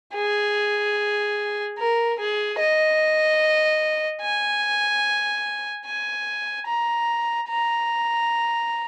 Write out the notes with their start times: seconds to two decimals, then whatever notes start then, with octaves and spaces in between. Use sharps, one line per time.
0.15 G#4
1.78 A#4
2.19 G#4
2.59 D#5
4.22 G#5
5.86 G#5
6.67 A#5
7.49 A#5